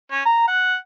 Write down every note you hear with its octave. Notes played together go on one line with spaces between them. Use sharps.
C#4
A#5
F#5